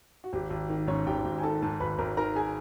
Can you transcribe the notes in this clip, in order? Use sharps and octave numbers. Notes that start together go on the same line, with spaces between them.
F#4
G#1 G4
G#1
D#3
G#2 C#4 C#5
G#1 G4 G5
G#1
G#5
D#3 A4 A5
G#2 A4 A5
G#1 B4 B5
G#1 A#4 A#5
D#3 A#4 A#5
G#4 G#5